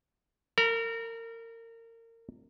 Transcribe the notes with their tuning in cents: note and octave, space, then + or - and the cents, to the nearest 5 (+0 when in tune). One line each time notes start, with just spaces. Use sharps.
A#4 -30 A#5 +40